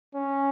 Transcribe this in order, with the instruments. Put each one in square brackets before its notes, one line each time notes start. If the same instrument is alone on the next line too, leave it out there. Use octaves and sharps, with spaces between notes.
[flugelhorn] C#4